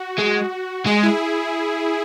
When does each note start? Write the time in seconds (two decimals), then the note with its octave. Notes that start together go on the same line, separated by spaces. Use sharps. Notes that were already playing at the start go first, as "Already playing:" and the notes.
Already playing: F#4
0.18 G#3
0.86 G#3 G#4
1.03 E4